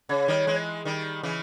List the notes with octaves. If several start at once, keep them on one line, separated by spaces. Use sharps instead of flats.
C#3 C#5
D#3 G3
E3 G#3
D#3 G3
C#3 E3